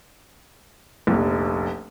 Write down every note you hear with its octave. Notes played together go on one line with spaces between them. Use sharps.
F1 A#1